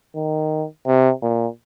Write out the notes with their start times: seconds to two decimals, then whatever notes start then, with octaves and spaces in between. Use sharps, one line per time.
0.15 D#3
0.86 C3
1.22 A#2